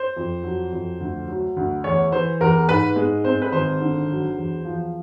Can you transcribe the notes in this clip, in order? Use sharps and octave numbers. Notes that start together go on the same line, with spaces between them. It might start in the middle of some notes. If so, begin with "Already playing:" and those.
Already playing: C5
F2
F#3
F2
D2
F#3
D2
E2 C#5
E3 C5
E2 A#4
G#2 B4
G#3
C4 C5
B4
G#1 C5
D3
F#3
E2
F3